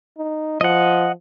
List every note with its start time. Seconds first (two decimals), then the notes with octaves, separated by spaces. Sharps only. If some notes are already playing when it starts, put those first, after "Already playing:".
0.18 D#4
0.61 F3 D#5 F#5